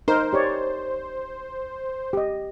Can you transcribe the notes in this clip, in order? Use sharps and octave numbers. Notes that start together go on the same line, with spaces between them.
D#4 A#4 C5
G4 C#5 D5
G4 D#5